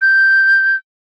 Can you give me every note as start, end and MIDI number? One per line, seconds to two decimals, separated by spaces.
0.02 0.76 91